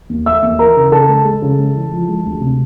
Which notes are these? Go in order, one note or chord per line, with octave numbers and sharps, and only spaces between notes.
D#2
A3 E5 E6
D#2
E3 A#4 A#5
C#3
C#3 A4 A5
G#3
G#3
C#3
G#3
E3
F3
G#3
D2
C3